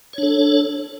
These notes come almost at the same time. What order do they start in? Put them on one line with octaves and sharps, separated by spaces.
C#5 D4 A4